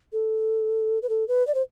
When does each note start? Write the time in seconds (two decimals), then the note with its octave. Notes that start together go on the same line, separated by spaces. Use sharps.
0.13 A4
1.02 B4
1.09 A4
1.28 B4
1.47 D5
1.55 C5